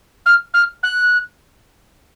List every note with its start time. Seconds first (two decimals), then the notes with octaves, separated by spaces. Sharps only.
0.25 F6
0.53 F6
0.83 F#6